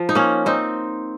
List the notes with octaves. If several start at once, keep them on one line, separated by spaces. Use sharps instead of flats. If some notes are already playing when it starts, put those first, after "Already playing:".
Already playing: F3
D#4
A#3 C#4
C4 D#4